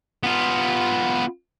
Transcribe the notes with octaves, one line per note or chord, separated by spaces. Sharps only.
B3 F4